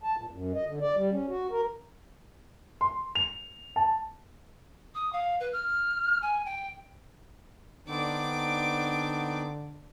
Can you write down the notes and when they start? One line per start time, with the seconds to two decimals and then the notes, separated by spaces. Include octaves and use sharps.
0.03 A5
0.16 A#2
0.31 F#2
0.54 D#5
0.66 D3
0.81 D5
0.96 G3
1.11 C#4
1.28 F#4
1.51 A#4
2.81 C6
3.15 F7
3.76 A5
4.94 D#6
5.12 F5
5.40 B4
5.53 F6
6.22 G#5
6.45 G5
7.88 D3 B3 C4 D4 D#4 D6